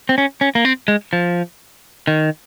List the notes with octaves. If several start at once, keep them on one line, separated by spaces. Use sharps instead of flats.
C4
C#4
C#4
A#3
C4
G#3
F3
D#3